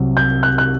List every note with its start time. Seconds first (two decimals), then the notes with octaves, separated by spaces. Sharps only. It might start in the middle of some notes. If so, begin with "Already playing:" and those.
Already playing: C2 C3 F#3
0.17 G6
0.43 F#6
0.58 F#6